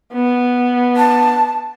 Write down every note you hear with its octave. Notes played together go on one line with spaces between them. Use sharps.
B3
A5